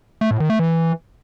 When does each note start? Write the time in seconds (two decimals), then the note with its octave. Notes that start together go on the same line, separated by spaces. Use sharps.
0.21 A3
0.31 A2
0.40 D#3
0.50 A3
0.59 E3